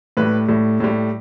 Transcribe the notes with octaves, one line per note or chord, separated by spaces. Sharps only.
A2 G3 B4
A2 G3
A2 G3